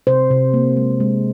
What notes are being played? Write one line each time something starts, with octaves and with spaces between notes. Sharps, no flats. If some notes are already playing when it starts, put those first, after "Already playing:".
C3 C5
C3
A#3
G#3
G#3